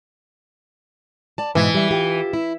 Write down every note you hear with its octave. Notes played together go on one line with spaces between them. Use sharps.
D5 A5
G#2 B2 E3
G3 E5
F4 G4
E4